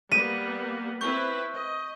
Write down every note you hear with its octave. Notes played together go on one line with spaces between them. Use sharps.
G3 A#3 B3 B6 D#7
C4 E4 B4 C#6 G6
D#5